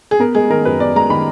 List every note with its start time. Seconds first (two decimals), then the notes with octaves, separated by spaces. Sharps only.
0.11 G#4
0.20 B3 A#4
0.35 G#3 G#4
0.50 D#3 A#4
0.65 F#2 B4
0.80 B3 D5
0.96 G#3 A#5
1.10 D#3 B5